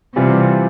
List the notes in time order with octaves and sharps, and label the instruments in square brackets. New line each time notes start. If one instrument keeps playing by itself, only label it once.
[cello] C3 [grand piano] E3 G3 C4 F4